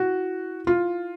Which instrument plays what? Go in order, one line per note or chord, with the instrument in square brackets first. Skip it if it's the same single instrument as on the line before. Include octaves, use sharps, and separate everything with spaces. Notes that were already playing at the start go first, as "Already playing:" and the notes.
Already playing: [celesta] E4 [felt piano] F#4
[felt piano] F4